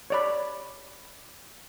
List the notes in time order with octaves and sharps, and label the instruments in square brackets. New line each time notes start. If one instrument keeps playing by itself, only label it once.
[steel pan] C#5 D5 B5